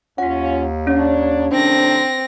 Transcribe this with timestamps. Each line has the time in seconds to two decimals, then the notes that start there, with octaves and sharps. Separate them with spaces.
0.18 D#2 C#4 F4 F#5 B6
0.87 C#4 D4 C#5
1.51 A2 C3 D#3 C4 D4 A#6